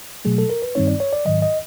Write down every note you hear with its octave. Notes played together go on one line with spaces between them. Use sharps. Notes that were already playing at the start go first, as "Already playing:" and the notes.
B2 F#3 A3 G#4
A4
A#4
B4
G2 D#3 G3 C4 D#4 C#5
D5
C#5
D5
G#2 D#3 F#3 D#5
D#5